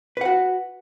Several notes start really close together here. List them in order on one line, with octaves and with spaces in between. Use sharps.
B4 F#5 F#4